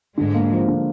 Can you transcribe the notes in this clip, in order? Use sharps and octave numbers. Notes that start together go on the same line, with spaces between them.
G#2 D3 G#3
A#3
F3
D3